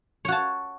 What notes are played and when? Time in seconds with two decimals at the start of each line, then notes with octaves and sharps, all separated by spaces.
0.25 C#5
0.28 F#4
0.32 A5